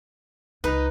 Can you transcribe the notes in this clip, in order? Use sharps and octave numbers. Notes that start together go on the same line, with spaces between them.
C#2 D#4 B4